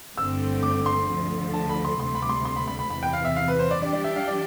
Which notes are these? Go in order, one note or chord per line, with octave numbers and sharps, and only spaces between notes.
G1 G2 D3 A3 C4 E6
D6
C6
D2 D3 F3
A5
B5
C6
D2 C3 G3 C6
B5
D6
C6
C6
B5
B5
B5
E2 C3 E3 B5
G5
F5
E5
F5
B4
C5
D5
E3 G3 D4 G4 D5
D5
E5
F5
D5